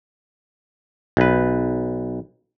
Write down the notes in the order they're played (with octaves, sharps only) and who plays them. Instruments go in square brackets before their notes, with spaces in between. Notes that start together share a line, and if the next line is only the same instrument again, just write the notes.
[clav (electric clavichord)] B1 B4